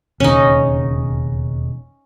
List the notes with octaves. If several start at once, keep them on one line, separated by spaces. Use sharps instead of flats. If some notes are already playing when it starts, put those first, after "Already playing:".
E1 D#2 C#3 C#4 D#4